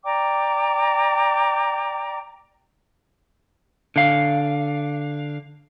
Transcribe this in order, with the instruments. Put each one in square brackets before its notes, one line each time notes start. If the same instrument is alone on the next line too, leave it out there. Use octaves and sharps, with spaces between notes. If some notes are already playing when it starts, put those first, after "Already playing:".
[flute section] D5 G5 A#5 D6
[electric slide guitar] D3 F5